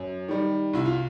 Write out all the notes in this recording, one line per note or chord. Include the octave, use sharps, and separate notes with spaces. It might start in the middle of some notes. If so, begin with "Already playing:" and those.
Already playing: F#2
D#3 G3
C2 E4
F4